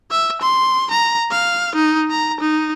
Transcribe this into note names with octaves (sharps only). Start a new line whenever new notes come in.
E5
C6
A#5
F5
D#4
A#5
D#4